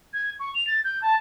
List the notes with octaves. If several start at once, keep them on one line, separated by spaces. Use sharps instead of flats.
G#6
C#6
F7
A6
G6
A5